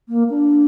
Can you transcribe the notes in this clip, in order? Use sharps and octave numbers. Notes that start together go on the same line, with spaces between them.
A#3
D4